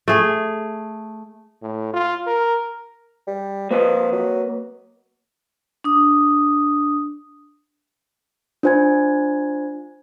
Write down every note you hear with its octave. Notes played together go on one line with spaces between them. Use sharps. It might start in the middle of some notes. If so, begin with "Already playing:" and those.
A3 G#4
A2
F4
A#4
G3
F3 A#3 B4 D#5
F#3
D4 D#6
D4 F4 C5 G#5 G#6